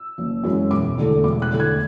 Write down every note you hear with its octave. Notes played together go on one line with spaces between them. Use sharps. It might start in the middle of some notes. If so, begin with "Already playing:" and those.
Already playing: E6
F#1
F#2 E3 G#3 C#4
E1 D6
E2 D3 A3
E1 D6
F#6
E2 D3 A3
G#6